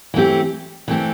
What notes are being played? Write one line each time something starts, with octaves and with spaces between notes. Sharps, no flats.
E3 A3 C4 G4
E3 A3 C4 G4